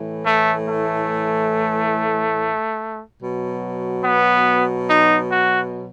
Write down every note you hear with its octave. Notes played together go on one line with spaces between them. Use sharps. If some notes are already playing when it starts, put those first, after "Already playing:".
Already playing: A2 E3
A3
A3
B2 F#3
B3
D#4
F#4